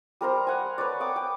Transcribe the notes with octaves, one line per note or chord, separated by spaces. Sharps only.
G3 A#4 C5 A#5
F#5 G#5
B4 C#5 D5
G5 D6 D#6
G5